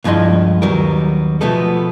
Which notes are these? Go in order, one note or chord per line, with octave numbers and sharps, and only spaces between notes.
C#2 G2 F3 E4 D#5 C6
D#2 F#3 G3 B3 A#4
B2 F3 A3 B3 A4